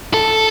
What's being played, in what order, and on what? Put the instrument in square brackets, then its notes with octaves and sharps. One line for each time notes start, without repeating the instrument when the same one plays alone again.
[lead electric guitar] A4